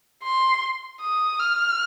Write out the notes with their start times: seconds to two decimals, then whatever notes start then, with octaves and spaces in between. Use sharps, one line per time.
0.24 C6
1.01 D#6
1.40 F6